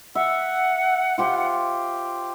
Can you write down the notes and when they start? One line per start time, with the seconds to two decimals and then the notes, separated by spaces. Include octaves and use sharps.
0.15 E5 F#5
1.18 F4 G4 C5